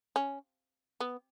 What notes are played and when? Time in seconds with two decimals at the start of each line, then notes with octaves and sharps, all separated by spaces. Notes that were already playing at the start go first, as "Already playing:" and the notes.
0.16 C#4
1.00 B3